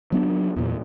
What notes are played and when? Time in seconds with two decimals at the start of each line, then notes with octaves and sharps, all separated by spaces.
0.12 F#3 B3 D4
0.56 E2 A#2